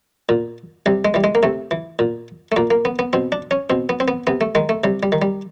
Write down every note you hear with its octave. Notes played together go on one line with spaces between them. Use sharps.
A#2
C3 G3
G#3
E3 G3
G#3
A#3
C3 A3
E3
A#2
A3
A#2 A#3
A#3
B3
B3
B2 C4
D4
C#4
B2 C4
B3
C4
B3
C3 B3
A3
D#3 G#3
A3
C3 G3
G3
D#3
G3